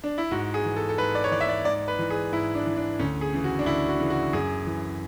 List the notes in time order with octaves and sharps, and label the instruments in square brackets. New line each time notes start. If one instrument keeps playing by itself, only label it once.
[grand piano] D4
E4
G#2 F#4
G#4
E3
A4
A4
G#2 B4
D5
C#5
E3 D5
E5
D5
G#2 D5
B4
E3
G#4
G#2 E4
D4
E3
D4
D2 C#4
G#4
C#3 E3
F#4
D4
D2 E4
F#4
C#3 E3
F#4
F#2 G#4
E3